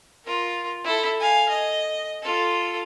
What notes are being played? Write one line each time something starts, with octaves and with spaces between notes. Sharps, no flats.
F4 A#4
E4 A4
F5 G#5
D#5
F4 A4